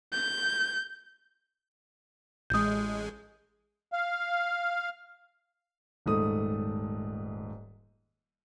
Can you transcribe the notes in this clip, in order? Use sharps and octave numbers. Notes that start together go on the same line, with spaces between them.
G6
A1 G#3 D#6 G6
F5
D#1 G#2 A3 D#6